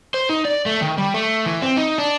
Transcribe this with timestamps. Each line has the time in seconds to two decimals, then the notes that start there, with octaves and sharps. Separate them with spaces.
0.14 C5
0.29 D#4
0.45 D5
0.66 A3
0.82 D#3
0.98 G3
1.14 A3
1.46 E3
1.62 C4
1.77 D#4
1.98 D4